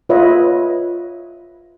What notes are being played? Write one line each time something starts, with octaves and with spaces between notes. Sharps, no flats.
F4 B4 C#5 D#5 E5